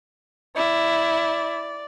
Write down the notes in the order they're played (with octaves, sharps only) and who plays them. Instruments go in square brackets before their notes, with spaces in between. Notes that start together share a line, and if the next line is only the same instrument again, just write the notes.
[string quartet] E4 [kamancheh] D5